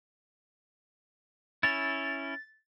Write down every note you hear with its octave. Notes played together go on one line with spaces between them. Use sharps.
C#4 E4 A6